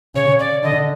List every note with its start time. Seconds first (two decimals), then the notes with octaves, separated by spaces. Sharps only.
0.15 C#3 C#5
0.39 D5
0.63 D3 D#5